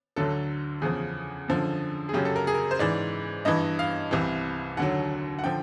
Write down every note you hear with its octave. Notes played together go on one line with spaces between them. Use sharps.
D2 D3 F#3 A4
E2 C#3 F3 G#4
F#2 D3 F3
G#4
F#2 C#3 F#3 G4
A4
A#4
G#4
A#4
C5
G#2 E3 D5
G2 E3 D#5
F5
C2 C3 E3
D#2 D3 F#3 F#5
F#5
D3 F3 G5